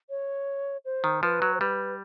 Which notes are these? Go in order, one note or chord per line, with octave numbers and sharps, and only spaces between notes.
C#5
C5
D#3
F3 B4
F#3
C5
G3 B4